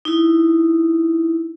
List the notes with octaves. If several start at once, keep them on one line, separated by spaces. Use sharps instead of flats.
D#4 E4